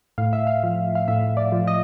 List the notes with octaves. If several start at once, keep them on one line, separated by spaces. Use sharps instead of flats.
A2 F5
E5
F5
F3
F5
A2 E5
D5
F3
D#5